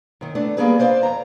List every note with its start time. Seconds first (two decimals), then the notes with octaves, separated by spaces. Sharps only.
0.21 F#2 D#3
0.35 A3 B3 D4
0.57 G3 A#3 B3 G#4 B4
0.79 B4 C5 D5 D#5 F5
1.03 F2 A#5